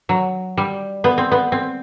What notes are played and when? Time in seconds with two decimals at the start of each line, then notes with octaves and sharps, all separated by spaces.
0.09 F#3
0.57 G3
1.04 B3
1.18 C4
1.32 B3
1.52 C4